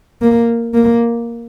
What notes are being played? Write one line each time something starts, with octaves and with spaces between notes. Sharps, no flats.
A#3
A#3